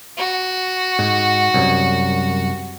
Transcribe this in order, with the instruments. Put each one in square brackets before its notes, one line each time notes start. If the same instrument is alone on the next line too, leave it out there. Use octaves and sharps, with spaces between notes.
[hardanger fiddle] F#4
[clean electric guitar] G#2
C2 F#2